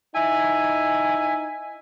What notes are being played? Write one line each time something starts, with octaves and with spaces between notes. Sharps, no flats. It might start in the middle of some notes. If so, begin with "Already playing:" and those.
D#4 E4 G#5